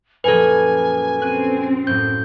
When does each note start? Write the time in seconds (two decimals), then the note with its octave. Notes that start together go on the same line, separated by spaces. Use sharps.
0.24 A#1 F#2 A4 B4 G#5
1.20 C4 C#4 F#6 D#7
1.87 F#2 A2 G6